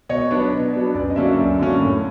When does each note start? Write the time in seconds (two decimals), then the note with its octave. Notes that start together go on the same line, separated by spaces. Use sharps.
0.09 B2 C#5 D#5
0.31 F#3 B3 D4
0.52 B2
0.74 F#3 B3 D4
0.95 F#2 D5
1.10 D#5
1.16 D3 F#3 A#3 C#4 D5 E5
1.38 F#2
1.59 D3 F#3 A#3 C#4
1.80 A2